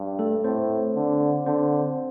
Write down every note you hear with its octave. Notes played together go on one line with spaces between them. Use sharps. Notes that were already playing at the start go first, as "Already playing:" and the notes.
Already playing: G2
A3 A4
A2 C4 C5
D3
D3 C4 C5